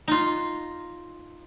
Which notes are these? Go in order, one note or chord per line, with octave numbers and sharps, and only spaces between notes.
D#4 F4